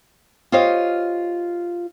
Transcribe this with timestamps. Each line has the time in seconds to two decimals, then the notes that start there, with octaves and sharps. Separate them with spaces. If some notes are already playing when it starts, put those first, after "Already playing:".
0.52 F4 G4 C5 C#5 D#5 F5